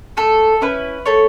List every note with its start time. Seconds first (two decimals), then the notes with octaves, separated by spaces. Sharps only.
0.17 A3 A4
0.61 C#4 E4 B4
1.06 A3 A4 C#5